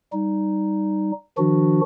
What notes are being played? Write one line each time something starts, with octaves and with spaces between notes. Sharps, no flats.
G3 D#4
D#3 F3 D4 F#4